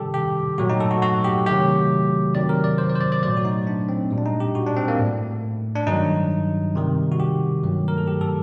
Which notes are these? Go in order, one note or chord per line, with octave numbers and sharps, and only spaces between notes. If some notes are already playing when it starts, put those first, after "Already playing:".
Already playing: C3 D#3 G3 G4 A4
G4
A#2 F#3 A3 F#4
D#4
A4
F#4
F#4
G4
C3 D#3 F#3 A3 G4
C3 D#3 F#3 D5
A#4
D5
C5
D5
C5
D5
D5
A#2 F#3 A3 D5
F#4
D#4
D4
C4
A#2 G3
D4
D#4
G4
F#4
D4
C4
A#3
A2 A3
D4
G2 D#3 F#3 D#4
C3 D#3 G3
F#4
G4
G2 D#3 F#3 A3
A#4
A4
G4
A4